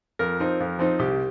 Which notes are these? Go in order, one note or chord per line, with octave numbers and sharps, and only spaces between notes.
F2 A#4
F3 C4 D#4
F2
F3 C4 D#4
C2 G4